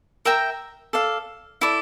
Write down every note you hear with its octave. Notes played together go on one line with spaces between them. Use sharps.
A#4 E5 G5 A#5
A4 D5 F5
E4 A4 D5